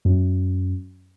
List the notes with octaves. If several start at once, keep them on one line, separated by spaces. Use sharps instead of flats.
F#2